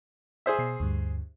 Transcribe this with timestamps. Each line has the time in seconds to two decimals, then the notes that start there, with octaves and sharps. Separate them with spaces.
0.46 G#4 C5 E5
0.59 B2 C7
0.80 D2 G2